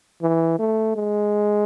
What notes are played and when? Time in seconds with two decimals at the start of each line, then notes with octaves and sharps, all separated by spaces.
0.22 E3
0.59 A3
0.96 G#3